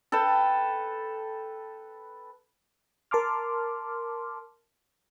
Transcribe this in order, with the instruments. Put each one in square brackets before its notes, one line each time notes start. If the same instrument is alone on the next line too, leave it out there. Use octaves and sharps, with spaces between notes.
[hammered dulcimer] A4 B4 G5 A5
[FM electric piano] A#4 A5 C6 D6 F6